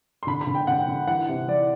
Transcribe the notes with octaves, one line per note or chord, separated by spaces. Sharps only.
C6
D3 B5
B5
D3
G5
D3 F#5
G5
D3
E3 F#5
C3
E3 D5